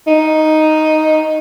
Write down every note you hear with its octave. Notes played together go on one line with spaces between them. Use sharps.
D#4